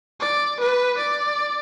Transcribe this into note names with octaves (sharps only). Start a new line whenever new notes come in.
D5
B4
D5